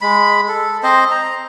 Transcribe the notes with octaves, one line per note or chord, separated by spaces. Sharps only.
G#3 B5
A4
C4 C5 D#5
A#5